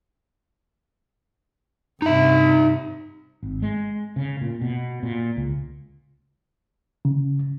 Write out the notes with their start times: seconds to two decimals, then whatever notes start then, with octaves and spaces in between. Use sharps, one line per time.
2.02 G2 C3 D#4 E5
3.43 G#1
3.62 G#3
4.16 C#3
4.41 A#2
4.61 B2
5.03 A#2
5.37 C#2
7.05 C#3